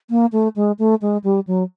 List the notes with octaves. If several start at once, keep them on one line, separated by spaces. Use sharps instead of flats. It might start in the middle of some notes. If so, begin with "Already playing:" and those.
A#3
A3
G#3
A3
G#3
G3
F#3